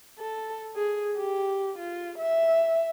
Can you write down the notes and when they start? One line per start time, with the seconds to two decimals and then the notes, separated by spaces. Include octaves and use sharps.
0.19 A4
0.76 G#4
1.17 G4
1.78 F4
2.18 E5